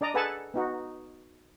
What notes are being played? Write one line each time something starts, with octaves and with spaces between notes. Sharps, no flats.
D4 D5 D#5 A#5
G#4 A4 B4 F#5 G#5 A5
B3 D#4 F#4